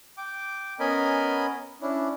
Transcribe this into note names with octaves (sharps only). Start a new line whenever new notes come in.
G5 D6
B3 C#4 A#4 D#5 G#5 B5
C#4 D4 E4